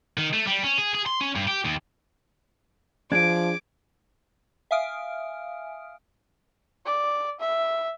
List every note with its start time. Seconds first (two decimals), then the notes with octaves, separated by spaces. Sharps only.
0.18 D#3
0.33 A3
0.47 G3
0.63 C#4
0.78 G#4
0.94 G#4
1.06 C6
1.21 C#4
1.36 G2
1.47 G4
1.65 D#2
3.12 F3 D4 G#4 D6 G#6 D7
4.71 E5 F5 G#5 D#6 F6 D7
6.85 D5
7.40 E5